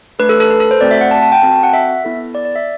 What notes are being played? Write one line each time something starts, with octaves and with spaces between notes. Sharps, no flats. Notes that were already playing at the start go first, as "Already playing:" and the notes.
A3 D4 A4 B4
A4
A4
B4
A4
C5
A3 C4 F#4 D5
E5
F#5
A5
A5
G5
C4 F#4 A4 A5
G5
F#5
E5
B3 E4 A4
D5
D5
E5